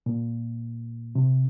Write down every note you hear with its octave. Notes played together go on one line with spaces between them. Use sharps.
A#2
C3